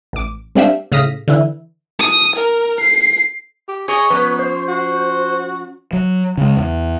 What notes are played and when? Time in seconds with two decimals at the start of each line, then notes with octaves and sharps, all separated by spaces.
0.13 A1 D6
0.55 G3 C4 D4 G4 E5 F5
0.92 A2 C#3 F5 D#6 A#6 B6
1.28 D3 E3 E4
1.99 D#6
2.35 A#4
2.80 C7
3.68 G4
3.88 G#4 C#5 D#5
4.10 F3 B3 C#4 B4
4.39 C5
4.68 F#4
5.93 F#3
6.38 C#3 G#3
6.57 E2